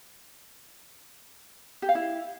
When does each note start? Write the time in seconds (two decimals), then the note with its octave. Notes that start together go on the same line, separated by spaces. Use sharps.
1.82 G4
1.89 F5
1.95 E4